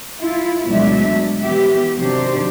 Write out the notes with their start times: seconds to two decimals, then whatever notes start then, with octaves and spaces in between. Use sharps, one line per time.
0.21 E4 F4
0.68 D2 B2 F#3 G#3 D4 E5
1.42 E3 B3 G4 E5
1.97 C3 D#3 F#3 D4 G4 C5